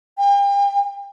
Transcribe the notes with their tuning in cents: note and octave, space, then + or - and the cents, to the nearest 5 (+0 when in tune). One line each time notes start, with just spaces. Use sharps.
G5 +40